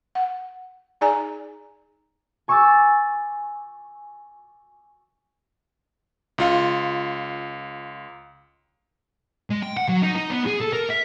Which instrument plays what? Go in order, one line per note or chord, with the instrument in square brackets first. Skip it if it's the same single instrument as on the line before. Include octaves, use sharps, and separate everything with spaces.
[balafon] F#5
D#4 G#4 D5 G#5 A#5
[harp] G#5 C#6 D6 E6 G6 A6
[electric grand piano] C#2 F4 F5
[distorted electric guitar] G#3
G5
F#5
F#3
D#4
D#4
B3
G#4
A4
A#4
E5